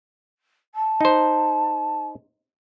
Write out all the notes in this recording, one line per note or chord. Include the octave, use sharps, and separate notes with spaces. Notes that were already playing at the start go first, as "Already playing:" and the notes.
A5
D#4 C5